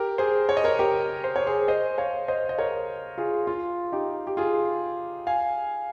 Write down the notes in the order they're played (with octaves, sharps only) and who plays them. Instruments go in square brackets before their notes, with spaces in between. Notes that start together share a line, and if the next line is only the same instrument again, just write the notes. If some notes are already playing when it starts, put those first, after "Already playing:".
Already playing: [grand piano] G4 A#4
G#4 C5
C#5
D#5
A#4 C#5
G4 A#4
C5
C#5
G#4 C5
C5 D#5
C#5 F5
C5 D#5
D#5
A#4 C#5
F4 G#4
F4
D#4 G4
G4
F4 G#4
F5 G#5